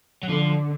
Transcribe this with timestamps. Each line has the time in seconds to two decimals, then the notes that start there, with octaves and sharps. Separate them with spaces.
0.23 F#3
0.29 D3 F3